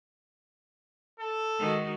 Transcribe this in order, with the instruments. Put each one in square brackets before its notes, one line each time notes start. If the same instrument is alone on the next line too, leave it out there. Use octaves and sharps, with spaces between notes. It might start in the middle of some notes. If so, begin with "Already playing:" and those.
[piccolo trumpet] A4
[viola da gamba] D#3 G#3 F#4